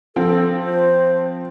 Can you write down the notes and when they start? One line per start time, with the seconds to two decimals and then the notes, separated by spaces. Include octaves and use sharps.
0.16 F3 C4 A4
0.63 C5